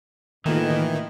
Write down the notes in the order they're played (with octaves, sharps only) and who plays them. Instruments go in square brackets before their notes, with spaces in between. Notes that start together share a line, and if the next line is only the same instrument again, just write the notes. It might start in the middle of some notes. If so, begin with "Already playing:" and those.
[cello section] A2 E4 D#5 [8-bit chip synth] D#3 [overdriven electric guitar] E3 [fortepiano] A3 A#3 F4